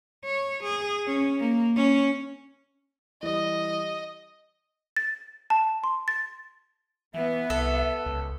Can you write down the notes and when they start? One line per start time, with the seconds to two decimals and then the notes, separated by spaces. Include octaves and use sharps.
0.25 C#5
0.63 G#4
1.07 C#4
1.40 A#3
1.76 C#4
3.23 E3 G3 D#5
4.96 A6
5.50 A5
5.84 C6
6.08 A6
7.14 E3 B3 E5
7.50 C2 A4
8.06 C#2